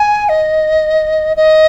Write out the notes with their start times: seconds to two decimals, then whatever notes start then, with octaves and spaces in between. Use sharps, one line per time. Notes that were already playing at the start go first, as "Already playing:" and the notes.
Already playing: G#5
0.29 D#5
1.37 D#5